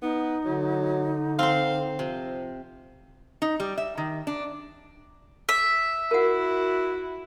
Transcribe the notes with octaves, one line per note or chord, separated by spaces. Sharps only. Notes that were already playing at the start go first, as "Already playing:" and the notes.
B3 D#4
D3 F#3
C4 C5 F5
C3 F3
D#4
G3
E5
D#3
D4
E5 D6
E4 F#4 A#4 F#5